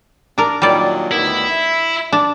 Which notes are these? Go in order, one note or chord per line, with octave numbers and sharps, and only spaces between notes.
D4 A#4
A#2 D#3 F#3 G3 D5
D2 D#3 B3 E4
E5
D4